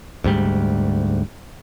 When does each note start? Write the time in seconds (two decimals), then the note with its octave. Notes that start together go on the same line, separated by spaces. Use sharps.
0.24 D2 G#2 G3